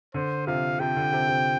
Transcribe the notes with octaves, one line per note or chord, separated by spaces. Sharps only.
D3 C5
C3 F3 F5
C3 F3 G5
D3
C3
C3